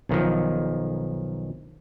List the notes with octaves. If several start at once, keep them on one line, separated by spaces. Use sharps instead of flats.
B1 D#3 F3